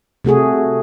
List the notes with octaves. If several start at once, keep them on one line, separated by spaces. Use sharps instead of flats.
C3 A3 F#4 G#4